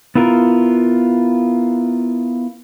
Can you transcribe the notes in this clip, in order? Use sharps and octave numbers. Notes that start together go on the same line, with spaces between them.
B3 E4 F4 A#4